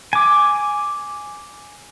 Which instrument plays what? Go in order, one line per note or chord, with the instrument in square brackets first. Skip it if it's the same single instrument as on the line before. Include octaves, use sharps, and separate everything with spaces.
[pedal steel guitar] G#5 D6